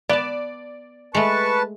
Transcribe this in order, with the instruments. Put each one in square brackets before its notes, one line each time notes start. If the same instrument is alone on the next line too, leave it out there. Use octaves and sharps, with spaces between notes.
[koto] B3 A5 [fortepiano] D5
[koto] G#3 A3 [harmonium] B4 A5 [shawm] C#6